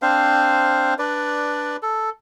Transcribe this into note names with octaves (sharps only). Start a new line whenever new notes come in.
C4 D4 C5 F5
D4 B4 D5
A4